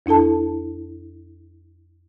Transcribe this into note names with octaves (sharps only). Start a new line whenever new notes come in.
F2 D4 E4 A4 A5